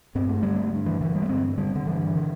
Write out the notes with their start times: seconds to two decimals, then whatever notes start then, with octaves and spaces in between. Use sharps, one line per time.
0.15 G2 C4
0.29 A3
0.43 D3 G3
0.56 A3
0.73 G2
0.86 E3
1.01 D3 E3
1.15 G3
1.22 A3
1.29 G2 C4
1.58 D3 G3
1.75 D3
1.87 G2 E3
2.15 D3